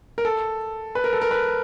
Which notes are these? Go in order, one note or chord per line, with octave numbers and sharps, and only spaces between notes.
A#4
A4
B4
A#4
A4
A#4
B4